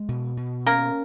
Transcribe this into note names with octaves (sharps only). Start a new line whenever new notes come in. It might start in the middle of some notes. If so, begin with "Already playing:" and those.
Already playing: G#3
B2
B2
A#3 C#4 A#4